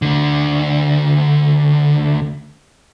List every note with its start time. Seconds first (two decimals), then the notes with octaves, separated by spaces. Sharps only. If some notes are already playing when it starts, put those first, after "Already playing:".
0.02 D2 D3